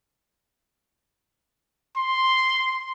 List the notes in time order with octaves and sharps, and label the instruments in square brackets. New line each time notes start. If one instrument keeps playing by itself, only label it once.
[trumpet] C6